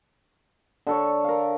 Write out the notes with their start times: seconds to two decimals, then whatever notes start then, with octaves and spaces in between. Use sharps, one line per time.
0.87 D3 A4 C#5
1.24 A#4 F5